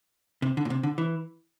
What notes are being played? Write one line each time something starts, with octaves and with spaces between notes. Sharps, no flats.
C3
D3
A#2
C3
D3
E3